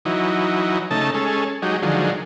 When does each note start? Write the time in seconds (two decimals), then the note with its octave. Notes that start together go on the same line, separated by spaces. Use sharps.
0.05 E3 F#3 D#4
0.91 C#3 A3 D#4 A5
1.14 G#3 C#4 A4
1.62 F#3 G#3 D#4 G4
1.82 D3 D#3 F3 F#3 G#3